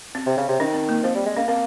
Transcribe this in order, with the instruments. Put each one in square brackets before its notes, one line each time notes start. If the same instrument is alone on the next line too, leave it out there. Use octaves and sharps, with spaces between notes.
[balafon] C4
[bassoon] C3
C#3
C3
[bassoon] D#3 [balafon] C#4
[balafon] C4
A#3
[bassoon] F3 [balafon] C4
[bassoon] G3
G#3
[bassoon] A#3 [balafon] C#4
[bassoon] A#3 [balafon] C4